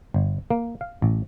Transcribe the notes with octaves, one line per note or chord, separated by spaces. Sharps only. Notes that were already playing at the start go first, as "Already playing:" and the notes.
G1
A#3
F5
A1